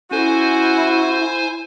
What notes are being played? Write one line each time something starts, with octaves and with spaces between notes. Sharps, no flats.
C#4 E4 F#4 A4 C5 G#5